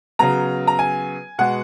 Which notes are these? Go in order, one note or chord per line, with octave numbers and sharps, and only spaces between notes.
C#3 F#3 B3 A#5
A#5
G#5
B2 G#3 B3 F#5